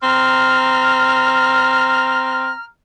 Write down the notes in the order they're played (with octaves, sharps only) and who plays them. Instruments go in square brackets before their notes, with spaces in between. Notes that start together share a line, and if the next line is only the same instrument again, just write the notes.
[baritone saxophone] C4 [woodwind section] A#5 F6